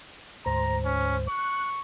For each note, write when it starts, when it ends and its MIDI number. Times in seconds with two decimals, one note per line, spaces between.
0.46 1.28 38
0.46 1.28 44
0.46 1.28 72
0.46 0.78 82
0.85 1.16 61
1.28 1.81 85
1.28 1.70 90